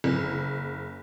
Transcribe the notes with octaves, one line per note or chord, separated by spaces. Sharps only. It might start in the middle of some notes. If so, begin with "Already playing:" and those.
F#1